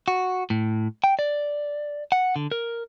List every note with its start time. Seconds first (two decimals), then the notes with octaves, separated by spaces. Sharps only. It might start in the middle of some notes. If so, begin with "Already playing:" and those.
0.08 F#4
0.50 A2
1.04 G5
1.19 D5
2.12 F#5
2.36 D3
2.52 A#4